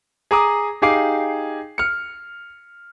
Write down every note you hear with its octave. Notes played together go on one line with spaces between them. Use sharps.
G#4 A#5 D6 D#6
D#4 G4 G#4 F5 D6 C7
F6 C#7